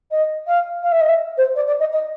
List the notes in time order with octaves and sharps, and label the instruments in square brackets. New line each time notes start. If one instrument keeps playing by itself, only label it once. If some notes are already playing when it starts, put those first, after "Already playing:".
[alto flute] D#5
F5
F5
E5
D#5
E5
C5
D5
D5
D#5
D#5